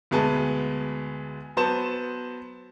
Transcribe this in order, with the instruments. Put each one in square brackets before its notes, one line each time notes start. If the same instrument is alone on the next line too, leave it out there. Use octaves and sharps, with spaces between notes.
[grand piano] D2 B2 G#3 B3 G#5 A5
F#3 B3 C5 A5 E7